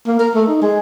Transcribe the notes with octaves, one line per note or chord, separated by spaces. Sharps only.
A#3
A#4
A3
D#4
G#3